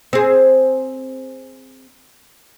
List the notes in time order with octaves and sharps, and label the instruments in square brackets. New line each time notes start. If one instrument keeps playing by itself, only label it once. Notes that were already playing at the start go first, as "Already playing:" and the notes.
[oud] C4 G#4